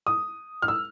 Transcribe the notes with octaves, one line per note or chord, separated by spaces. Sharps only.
D#6
F6
E6